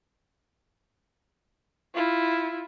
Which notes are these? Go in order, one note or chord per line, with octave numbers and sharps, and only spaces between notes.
E4 F4